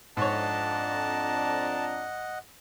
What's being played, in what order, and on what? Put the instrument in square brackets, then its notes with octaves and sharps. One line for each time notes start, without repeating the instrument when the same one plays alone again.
[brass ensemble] F2 D4 A#5 [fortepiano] G#2 C#5 [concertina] D#5 F#5 [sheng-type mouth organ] A5